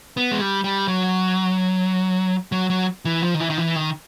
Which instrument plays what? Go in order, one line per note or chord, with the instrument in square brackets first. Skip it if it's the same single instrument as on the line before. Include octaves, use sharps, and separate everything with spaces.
[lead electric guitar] B3
G#3
G3
G3
F#3
F#3
F#3
E3
F3
D#3
E3
D#3
E3
D#3